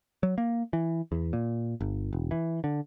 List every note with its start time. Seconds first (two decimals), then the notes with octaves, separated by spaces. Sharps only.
0.23 F#3
0.38 A#3
0.73 E3
1.12 E2
1.33 A#2
1.81 G1
2.13 E1
2.31 E3
2.64 D3